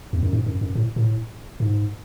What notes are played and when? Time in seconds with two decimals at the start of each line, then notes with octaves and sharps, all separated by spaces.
0.13 E2
0.23 F#2
0.33 G#2
0.46 F#2
0.61 F#2
0.75 A2
0.96 A2
1.60 G#2